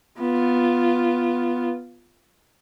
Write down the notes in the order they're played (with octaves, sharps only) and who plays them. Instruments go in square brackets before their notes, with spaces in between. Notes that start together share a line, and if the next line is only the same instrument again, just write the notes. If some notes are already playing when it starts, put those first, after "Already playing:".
[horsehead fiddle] B3 F4